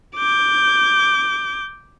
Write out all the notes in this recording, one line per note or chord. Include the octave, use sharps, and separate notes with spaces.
D6 G6